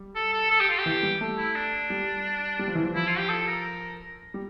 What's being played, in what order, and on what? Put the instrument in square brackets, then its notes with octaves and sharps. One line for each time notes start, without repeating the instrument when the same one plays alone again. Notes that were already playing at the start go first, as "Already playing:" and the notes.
Already playing: [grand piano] G3
[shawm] A4
A4
A4
G4
F4
G4
[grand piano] E3
G3
A3
[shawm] E4
D4
[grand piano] G3
G3
F3
E3
F3
[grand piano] F3 [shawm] E4
[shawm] F4
G4
A4
A#4
[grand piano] G3